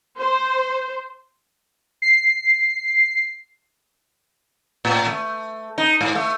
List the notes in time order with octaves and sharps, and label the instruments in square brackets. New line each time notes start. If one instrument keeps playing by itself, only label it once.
[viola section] C5
[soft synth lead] C7
[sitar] A2
A3
D#4
G#2
A3